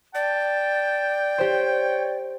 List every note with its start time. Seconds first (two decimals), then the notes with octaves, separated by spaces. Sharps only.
0.15 D5 G5 A5
1.38 G4 C5 C#5